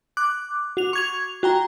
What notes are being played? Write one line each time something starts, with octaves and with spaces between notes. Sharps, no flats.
D6 F#6
F#4 F7
C#6 G#6 F7
F#4 G5 A#5